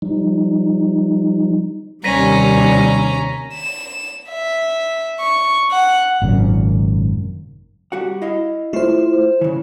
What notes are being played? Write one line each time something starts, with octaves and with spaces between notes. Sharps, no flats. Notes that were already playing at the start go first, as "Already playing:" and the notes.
F3 G3 D#4
D#2 C3 G3 C#4 A#5 A#6 B6 D#7
E7
E5
C#6
F#5
G#1 F#2 A#2 C#3
G3 F#4 F#5
E4 D#5 F5
A3 E4 F4 C5
C#3 E3